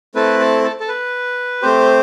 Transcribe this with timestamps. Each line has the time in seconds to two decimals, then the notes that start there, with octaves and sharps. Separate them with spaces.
0.15 A3 C4 E4 A4 B4
0.39 A4
0.64 A4
0.80 A4
0.88 B4
1.62 A3 C4 G4 C5